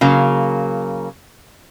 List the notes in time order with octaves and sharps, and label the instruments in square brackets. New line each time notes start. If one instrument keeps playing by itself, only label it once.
[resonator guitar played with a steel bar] C#3 F#3 A#3